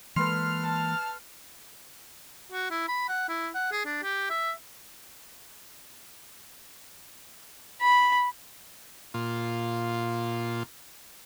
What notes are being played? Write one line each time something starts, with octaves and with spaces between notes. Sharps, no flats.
E3 G#3 A#3 A4 B4 C6 F6
A5
F#4
E4
B5
F#5
E4
F#5
G#4
D4
G4
E5
B5
A#2 F4